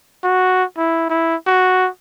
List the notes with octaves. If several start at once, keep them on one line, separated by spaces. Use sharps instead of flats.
F#4
E4
E4
F#4